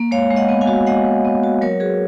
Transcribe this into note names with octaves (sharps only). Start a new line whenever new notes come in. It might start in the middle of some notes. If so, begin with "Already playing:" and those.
Already playing: A#3
G#3 C#5 F5
G#3
D#5 F#5
B3
F5 G#5
F#4
G#3 D#5 F#5
G#3
B3
F#4
F#3 A#4 C#5
F#4 G#4 B4